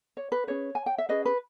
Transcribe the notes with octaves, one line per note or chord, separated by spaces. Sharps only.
C#5
B4
C#4 G#4 B4 C#5
G#5
G5
E5
C#4 G#4 B4 D#5
B4